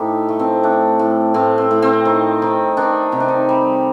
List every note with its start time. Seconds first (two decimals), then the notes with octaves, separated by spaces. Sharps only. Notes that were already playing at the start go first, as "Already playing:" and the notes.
Already playing: A2 D#4 G4 A4 C5
0.29 A3
0.39 C4
0.63 A3 D4
0.99 A2
1.34 A2 C4
1.58 C4
1.71 A2
1.82 C4
2.05 D#3
2.42 D#3
2.77 D#3 D4
3.12 C3 D#4
3.20 D4
3.28 D#4
3.49 G3